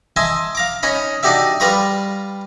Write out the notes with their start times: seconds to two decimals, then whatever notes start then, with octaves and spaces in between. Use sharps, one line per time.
0.16 D#5 E5 G#5 A5 C6
0.55 F5 A#5 D6
0.83 C#4 D#4 C#5 D#5 B5
1.23 D4 D#4 F#4 G4 D5 E5
1.60 G3 F4 B4 A#5 B5 C#6